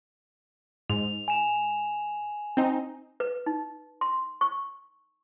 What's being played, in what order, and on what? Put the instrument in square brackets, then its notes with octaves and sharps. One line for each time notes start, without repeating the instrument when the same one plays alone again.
[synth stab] G#2 [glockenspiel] F7
[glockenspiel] G#5 E7 F7
[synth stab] C4 D#4
[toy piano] B4
D#4
C6
C#6